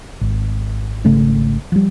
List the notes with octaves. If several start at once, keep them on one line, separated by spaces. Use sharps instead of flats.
G#1
G#1 C#3 A3 C#4
F3 G3